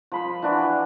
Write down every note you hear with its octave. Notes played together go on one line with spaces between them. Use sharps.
F3 B5 C6
E3 D4 F#4